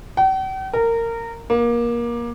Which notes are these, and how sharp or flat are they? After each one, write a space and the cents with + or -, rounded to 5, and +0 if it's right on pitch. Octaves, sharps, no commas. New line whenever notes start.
G5 -45
A#4 -20
A#3 +25